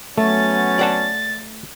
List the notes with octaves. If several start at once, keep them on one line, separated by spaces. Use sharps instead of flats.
F#3 A3 B3 C#4 A6
D5 F#5 A5